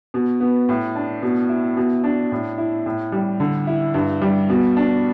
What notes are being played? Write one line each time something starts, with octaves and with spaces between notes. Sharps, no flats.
B2
B3
A2
D4
B2
E4
B2
D4
A2
E4
A2
G3
D3
E4
G2
G3
B2
D4